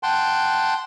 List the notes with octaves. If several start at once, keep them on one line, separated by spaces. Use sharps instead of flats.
F#5 G5 A5 C6